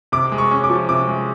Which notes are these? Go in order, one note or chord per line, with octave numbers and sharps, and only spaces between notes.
C3 D6
G#3
C#6
C#4
D6
F3
C3 D6
G#3